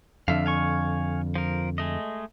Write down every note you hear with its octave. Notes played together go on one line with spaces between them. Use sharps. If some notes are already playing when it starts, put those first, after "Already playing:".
F2 D3 E5 F5
F5 G#5 C#6
F3 A#4
G#3 A3 D#5